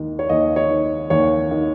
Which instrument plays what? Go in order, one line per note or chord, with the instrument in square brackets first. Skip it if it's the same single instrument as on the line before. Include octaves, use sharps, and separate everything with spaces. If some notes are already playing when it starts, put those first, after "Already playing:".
Already playing: [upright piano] D#2 D#3
C#5
D#2 D#5
C#5
D#3
D#2 C#5
D#3